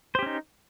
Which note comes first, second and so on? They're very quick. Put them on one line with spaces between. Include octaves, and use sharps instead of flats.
C5 G4 C#4 D#4